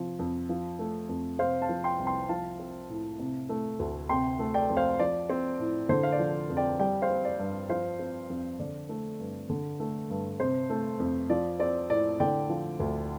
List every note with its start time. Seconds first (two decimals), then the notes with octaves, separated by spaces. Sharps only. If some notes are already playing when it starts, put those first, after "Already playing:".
Already playing: C3 F3
0.19 F2
0.49 F3
0.79 A3
1.09 F2
1.39 C3 C5 F5
1.62 F5 A5
1.69 F3
1.84 G5 C6
1.99 C2
2.06 G5 C6
2.29 F3 F5 A5
2.59 C4
2.90 A2
3.19 C3
3.49 A3
3.79 D2
4.09 C3 G5 C6
4.39 A3
4.54 D5 G5
4.70 F2
4.77 C5 F5
4.99 F3 D5
5.30 C4
5.59 A2
5.89 D3 C5
6.03 F5
6.12 D5
6.19 F3
6.50 F2
6.57 D5 G5
6.79 G3 D5 G5
7.02 C5 F5
7.10 C4
7.25 D5
7.39 G2
7.70 F3 C5 F5
7.99 C4
8.30 F2
8.59 D3 D5
8.89 A3
9.20 G2
9.50 D3
9.80 A3
10.10 G2
10.40 C3 C5
10.70 A3
11.00 F2
11.30 F3 D5
11.60 C4 D5
11.90 A2 D5
12.20 D3 D5 G5
12.50 F3
12.80 D2